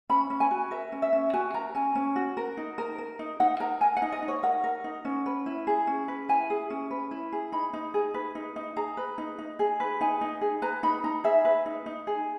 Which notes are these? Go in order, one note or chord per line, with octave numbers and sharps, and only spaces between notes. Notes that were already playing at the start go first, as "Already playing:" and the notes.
C#4 B5
C#4
G#5
F#4
A#4 E5
C#4
E5
C#4
F#4 G#5
A#4 A#5
C#4 G#5
C#4
F#4
A#4
D#4
A#4
A#4
D#4
D#4 F#5
A#4 A#5
A#4 G#5
F#5
D#4
D#5
D#4
C#5
A#4 F#5
A#4
D#4
C#4
B4
E4
G#4
C#4
B4
E4 G#5
G#4
C#4
B4
E4
G#4
D#4 B5
D#4
G#4
B4
D#4
D#4
G#4 A#5
B4
D#4
D#4
G#4
B4
D#4 G#5
D#4
G#4
B4 A#5
D#4 B5
D#4 A#5
G#4 E5
B4
D#4
D#4
G#4